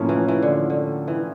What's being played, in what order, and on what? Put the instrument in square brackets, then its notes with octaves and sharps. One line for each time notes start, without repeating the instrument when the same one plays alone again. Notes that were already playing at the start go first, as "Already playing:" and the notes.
Already playing: [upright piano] A2 F3 A#3 C#4 [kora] A3
[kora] E3
E3
D3
D3
E3